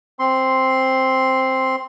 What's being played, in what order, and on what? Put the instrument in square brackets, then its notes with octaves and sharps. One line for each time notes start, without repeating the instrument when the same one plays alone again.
[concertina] C4 C6